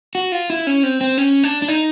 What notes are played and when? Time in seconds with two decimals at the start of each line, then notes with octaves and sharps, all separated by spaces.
0.15 F#4
0.32 F4
0.50 E4
0.67 C#4
0.83 C4
1.01 C4
1.18 C#4
1.44 D4
1.62 D4
1.68 D#4